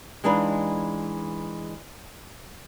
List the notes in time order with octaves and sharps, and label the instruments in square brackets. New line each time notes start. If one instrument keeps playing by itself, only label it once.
[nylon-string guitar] E3 G#3 D4 D#4 F4 B4